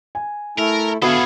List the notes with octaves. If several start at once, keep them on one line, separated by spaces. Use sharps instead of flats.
G#5
A3 E4 A4 A#4
D3 B3 F#4 G#4 A4 E5 F5